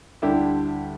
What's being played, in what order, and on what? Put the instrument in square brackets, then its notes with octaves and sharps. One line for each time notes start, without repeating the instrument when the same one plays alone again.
[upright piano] D2 D3 G3 D4 [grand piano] E4 G4